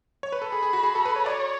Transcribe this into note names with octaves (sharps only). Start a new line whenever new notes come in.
C#5
B4
A4 B5
G#4
G#4
F#4
G#4
A4
B4
C#5
C#5 D5